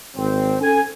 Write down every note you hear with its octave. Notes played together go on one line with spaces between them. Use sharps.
G#1 C4
C#4 A4 G#5